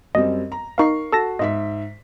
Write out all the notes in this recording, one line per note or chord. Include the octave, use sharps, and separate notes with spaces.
F#2 G3 C4 D#5
A#5
D#4 A#4 F5 C#6 C7
F#4 A4 A5 A#6
G#2 D#5 E5 B6